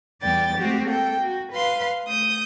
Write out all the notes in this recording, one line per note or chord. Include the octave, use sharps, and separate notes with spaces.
E2 G3 B3 D5 G5 A6
G#3 A3 C4 F#4 G4
A#3 A4 G5
F#4
B4 F5 C6
A3 D#6 G6